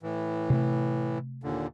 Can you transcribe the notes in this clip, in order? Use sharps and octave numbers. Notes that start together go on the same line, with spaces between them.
A2 E3
C3 A3
D#2 A#2 D3